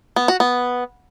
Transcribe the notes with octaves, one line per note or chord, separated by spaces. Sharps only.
B3
F#4
B3